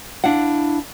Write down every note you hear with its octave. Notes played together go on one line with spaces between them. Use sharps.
D4 E4 F5 F#5